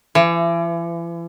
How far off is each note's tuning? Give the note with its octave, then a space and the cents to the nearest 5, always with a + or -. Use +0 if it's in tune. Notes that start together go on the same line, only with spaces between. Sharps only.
E3 +40